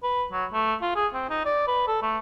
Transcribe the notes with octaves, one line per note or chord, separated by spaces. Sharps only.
B4
F#3
A3
F4
G#4
C4
D#4
D5
B4
A4
A3